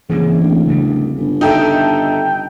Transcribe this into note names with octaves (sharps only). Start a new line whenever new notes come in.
C#3 E3 A#3 C4
D1
C#3 G3
G1
D#4 A4 E5 G5